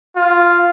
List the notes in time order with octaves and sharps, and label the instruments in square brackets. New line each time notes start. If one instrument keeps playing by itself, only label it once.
[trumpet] F4